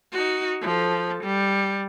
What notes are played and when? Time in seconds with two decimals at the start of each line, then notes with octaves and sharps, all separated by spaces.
0.12 D#4 F#4
0.61 F3 A4
1.23 G3